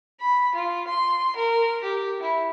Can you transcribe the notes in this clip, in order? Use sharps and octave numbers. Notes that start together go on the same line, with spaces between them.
B5
F4
C6
A#4
G4
E4